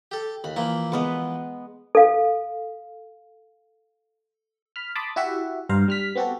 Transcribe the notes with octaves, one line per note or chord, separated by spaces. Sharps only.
G4 A4
D#2 B5
E3 F3 A#3 E4
G#3 B3 B4
A4 F5
B5 F6
A5 B5 C6 D6 D#6
E4 F#4 G4 E5 F#5
G2 C5 F5 A#5
G3 F6 B6
B3 C4 F#4 G4 A4